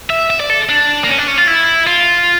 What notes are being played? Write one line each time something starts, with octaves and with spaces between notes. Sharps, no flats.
E5
E5
D5
A4
D4
A#3
C#4
D4
C#4
F4
E4
F4